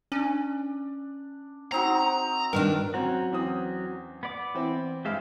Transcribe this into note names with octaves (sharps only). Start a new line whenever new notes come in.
C#4 D4
C4 D#4 F#4 A#5
G2 D#3 D4 A#4
F#3 C4 C#4 F#4 A#5
E2 C4 D#6
B3 D5 D6
E3 C4
G2 G#3 G4 E5 F5